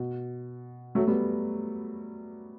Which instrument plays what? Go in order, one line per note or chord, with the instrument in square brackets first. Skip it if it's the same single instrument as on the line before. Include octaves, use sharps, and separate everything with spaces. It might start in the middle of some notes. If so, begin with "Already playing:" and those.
Already playing: [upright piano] B2
F#3 A3
G3 B3